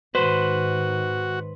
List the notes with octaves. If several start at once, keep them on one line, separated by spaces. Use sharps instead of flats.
G#2 D#3 F#4 B4 C5